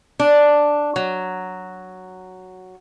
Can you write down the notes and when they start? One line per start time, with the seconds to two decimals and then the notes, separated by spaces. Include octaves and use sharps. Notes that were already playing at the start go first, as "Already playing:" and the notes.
0.20 D4
0.96 F#3